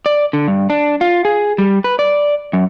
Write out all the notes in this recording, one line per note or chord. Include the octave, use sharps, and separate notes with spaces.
D5
D3
G2
D4
F4
G#4
G3
B4
D5
F#2